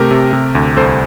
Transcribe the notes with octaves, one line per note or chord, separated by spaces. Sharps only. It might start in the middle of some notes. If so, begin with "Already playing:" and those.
Already playing: C3 A3 G4 A#4
C3
C3
D2
C2 A4 C5